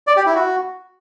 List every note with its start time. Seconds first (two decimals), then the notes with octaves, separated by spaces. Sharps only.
0.07 D5
0.16 G4
0.26 E4
0.35 F#4